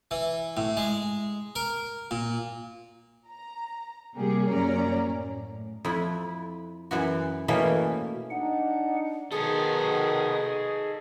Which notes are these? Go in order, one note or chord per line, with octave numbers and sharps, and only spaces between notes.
E3
A2
G#3
A#4
A#2
A#5
C3 G3 A#3 G4 G#4
F#2 F#3 A#3 C#4 D5 A#5
A2
F2 E4
F#2 E3 F#4
B2 E3 A3 A#3 C#4
D4 D#4 F#5
B2 D#3 D#4 G#4 A4 D#6